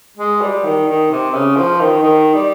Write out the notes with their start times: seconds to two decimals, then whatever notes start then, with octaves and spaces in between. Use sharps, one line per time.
0.18 G#3
0.41 G3
0.64 D#3
0.88 D#3
1.11 C3
1.34 C#3
1.56 F3
1.81 D#3
2.03 D#3
2.34 G3